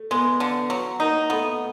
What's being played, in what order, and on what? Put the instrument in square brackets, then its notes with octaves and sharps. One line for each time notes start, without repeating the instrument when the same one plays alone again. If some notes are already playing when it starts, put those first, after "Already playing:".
Already playing: [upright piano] A3
[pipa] G#3 [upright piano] B3
[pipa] D3
F#3
[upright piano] A#3 [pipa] D#4
[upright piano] A3 [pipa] B3